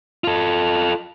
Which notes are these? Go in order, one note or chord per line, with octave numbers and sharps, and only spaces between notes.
F4 A4